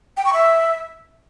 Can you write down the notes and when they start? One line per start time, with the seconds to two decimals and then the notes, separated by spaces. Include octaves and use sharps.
0.17 G5
0.25 C#6
0.33 E5